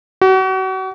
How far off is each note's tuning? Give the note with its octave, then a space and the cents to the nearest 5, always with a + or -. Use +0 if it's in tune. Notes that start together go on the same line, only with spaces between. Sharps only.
F#4 +35